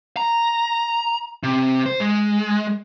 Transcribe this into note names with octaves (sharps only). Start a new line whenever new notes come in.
A#5
C3
C5
G#3